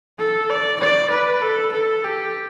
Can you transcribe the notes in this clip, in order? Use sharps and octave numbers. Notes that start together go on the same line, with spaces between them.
A4
D5
D5
B4
A4
A4
G4